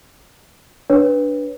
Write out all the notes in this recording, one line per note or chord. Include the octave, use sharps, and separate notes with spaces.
D4 B4 C#5